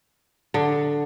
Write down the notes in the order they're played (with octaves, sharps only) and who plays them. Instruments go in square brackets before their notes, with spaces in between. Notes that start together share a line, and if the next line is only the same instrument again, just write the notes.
[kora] D3